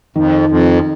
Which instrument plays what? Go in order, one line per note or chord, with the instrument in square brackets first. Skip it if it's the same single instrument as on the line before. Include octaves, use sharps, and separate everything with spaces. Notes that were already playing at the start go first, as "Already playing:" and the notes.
[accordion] F2 [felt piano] D#3
[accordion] F2